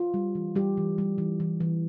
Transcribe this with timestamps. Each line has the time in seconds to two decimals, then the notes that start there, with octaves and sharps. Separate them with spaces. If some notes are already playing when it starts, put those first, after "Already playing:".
Already playing: F4
0.14 G3
0.35 E3
0.55 G3 G4
0.77 E3
0.98 G3
1.18 E3
1.40 E3
1.60 E3